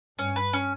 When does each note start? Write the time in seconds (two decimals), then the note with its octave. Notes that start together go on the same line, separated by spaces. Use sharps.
0.18 G2 C#4
0.36 B4
0.53 C#4